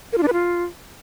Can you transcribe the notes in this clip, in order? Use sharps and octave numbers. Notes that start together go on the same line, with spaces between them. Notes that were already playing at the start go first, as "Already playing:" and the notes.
A#4
F4
D4
B4
F4